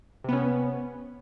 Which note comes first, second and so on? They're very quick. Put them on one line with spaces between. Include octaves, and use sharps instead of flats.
C3 B3 C#4